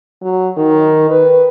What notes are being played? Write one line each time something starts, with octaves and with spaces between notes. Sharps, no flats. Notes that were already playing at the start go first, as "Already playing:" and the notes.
F#3
D#3
B4